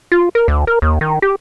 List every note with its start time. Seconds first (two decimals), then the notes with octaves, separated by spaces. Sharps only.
0.12 F4
0.35 A#4
0.48 D2
0.67 A#4
0.82 D#2
1.01 D#3
1.22 G4